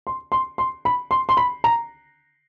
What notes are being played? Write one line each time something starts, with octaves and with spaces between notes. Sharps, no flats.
C6
C6
C6
B5
C6
C6
B5
A#5